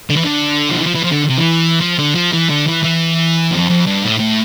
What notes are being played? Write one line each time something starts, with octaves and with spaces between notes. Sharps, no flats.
D3
E3
D3
F3
E3
F3
E3
F3
D3
C3
E3
F3
D3
F3
E3
D3
E3
E3
F2
F2
G2
A2
A2